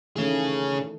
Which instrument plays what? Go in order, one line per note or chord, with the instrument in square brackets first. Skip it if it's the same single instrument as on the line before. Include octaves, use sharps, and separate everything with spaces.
[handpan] D#3 E3 A3 [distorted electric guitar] C#4 G#4